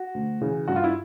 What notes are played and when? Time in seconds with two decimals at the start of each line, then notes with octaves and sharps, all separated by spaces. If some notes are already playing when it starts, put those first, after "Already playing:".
Already playing: F#4
0.14 D2
0.41 C#3 E3
0.68 G2 F#4
0.76 F4
0.84 E4